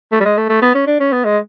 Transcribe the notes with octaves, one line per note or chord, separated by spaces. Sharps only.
A3
G3
G#3
A3
A3
B3
C#4
D4
C#4
B3
G#3